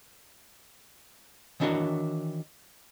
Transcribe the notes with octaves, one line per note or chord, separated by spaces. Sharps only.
D#3 E3 D4 F#4 A#4 C#5